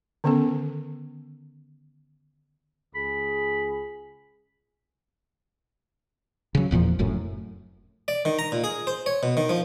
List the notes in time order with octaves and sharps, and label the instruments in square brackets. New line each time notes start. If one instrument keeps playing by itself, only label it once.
[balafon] D3 D#3 B3 C#4 A4
[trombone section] C#2 G#4 [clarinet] B5
[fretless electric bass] C#3 F#3
E1 E2 A#2 F3
F1 F#2 A2
[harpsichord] D5
D#3
A#5
A#2
G#4
C5
C#5
B2
D#3
F3